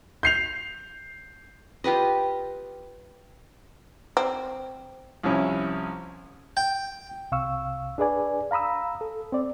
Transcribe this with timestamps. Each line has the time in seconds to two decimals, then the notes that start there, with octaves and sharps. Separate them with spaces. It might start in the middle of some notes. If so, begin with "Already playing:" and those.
0.23 G6 C7 F7
1.84 F4 G4 B4 D#5
4.17 C4
5.23 C2 F3 C#4 E4
6.57 G5
7.32 C2 C3 F5 C#6 E6
7.98 D4 G#4 B4 D5 G#5
8.51 F5 A#5 B5 D#6 E6
9.01 A4
9.32 C4 D5